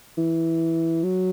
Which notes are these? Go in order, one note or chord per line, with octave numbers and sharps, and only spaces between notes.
E3
F#3